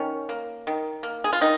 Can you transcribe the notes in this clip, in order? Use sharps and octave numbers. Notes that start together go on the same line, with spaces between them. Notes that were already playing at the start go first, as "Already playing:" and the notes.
Already playing: D#3 C#4
A#3
D#3
A#3
G#4
F4
D#3 D#4